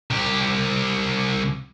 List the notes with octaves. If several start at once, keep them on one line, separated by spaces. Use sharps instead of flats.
C2 G4